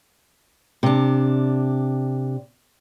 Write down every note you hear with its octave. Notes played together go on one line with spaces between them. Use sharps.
C3 D4